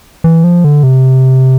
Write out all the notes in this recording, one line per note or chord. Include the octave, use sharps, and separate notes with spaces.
E3
F3
D3
C3